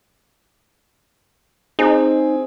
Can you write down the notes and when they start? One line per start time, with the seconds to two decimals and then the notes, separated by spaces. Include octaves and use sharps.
1.79 C4 D#4 G#4